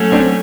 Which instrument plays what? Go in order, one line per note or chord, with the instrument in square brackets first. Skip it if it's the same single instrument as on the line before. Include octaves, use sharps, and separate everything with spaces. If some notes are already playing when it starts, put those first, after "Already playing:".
Already playing: [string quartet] F#3 A3 C#4
[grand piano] C4 D4